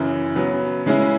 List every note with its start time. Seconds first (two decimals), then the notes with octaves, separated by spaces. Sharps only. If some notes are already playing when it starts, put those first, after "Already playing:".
Already playing: F#2 C#3 E3
0.36 C#3 F#3 B3
0.86 C#3 G#3 C#4 E4